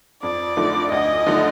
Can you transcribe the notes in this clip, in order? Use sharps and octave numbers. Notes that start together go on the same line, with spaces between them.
F2 D5
D3 F3 A3 D#4
D2 D#5
D3 F3 A3 D#4